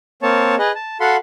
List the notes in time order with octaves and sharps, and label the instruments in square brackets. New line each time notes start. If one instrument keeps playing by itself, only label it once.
[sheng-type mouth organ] A#3 C4 C#5 A5
G#4 B4 D#5
A5
F#4 A4 F5 F#5 B5 C6